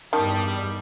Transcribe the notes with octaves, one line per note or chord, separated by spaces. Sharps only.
E2 G2 D#3 G3 A5 D#6